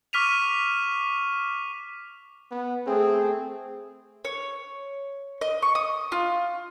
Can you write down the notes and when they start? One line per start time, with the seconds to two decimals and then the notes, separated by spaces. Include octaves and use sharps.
0.13 C#6 D6 F6 B6 D#7 F7
2.51 B3
2.87 A3 C4 G#4
4.25 C#5
5.41 D#5
5.62 C#6
5.75 D#6
6.12 F4